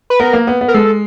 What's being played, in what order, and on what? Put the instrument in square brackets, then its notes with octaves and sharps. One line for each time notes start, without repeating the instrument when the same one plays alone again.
[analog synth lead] B4
[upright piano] B3 [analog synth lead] A#4
[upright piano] A#3
B3
B3
[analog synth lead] A#4
[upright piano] G#3 [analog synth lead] A4